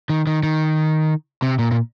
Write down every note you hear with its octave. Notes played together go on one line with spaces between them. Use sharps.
D#3
D#3
D#3
C3
A#2
A#2